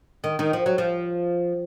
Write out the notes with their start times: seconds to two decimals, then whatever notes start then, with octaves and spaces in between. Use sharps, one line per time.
0.24 D#3
0.39 D#3
0.53 F3
0.66 F#3
0.78 F3